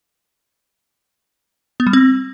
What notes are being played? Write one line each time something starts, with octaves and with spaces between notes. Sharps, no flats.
B3
G3
C4